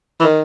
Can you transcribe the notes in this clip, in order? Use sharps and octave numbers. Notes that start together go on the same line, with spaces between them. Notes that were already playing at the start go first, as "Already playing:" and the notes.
E3
D#3